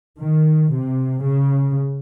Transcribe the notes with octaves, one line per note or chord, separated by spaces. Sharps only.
D#3
C3
C#3